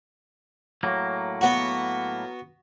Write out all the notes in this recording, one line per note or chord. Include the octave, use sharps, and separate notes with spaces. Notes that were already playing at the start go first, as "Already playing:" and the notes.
A2 F#3 A#3
B3 F#4